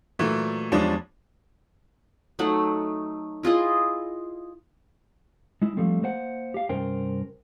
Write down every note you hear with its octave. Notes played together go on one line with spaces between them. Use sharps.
A#2 E3 F#3 A3
E2 F3 G3 G#3 C#4 D4
F#3 A3 D#4 F#5
E4 F4 G#4 D#5
G#3 E4
F3 G3 A3 C4
A#3 C5 F#5
G4 F5
C2 G2 C#4 A#4 C5 G5